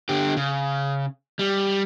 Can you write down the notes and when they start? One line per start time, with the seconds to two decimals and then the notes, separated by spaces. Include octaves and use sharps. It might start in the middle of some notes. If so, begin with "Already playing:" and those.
0.09 D3 G4
0.37 C#3
1.39 G3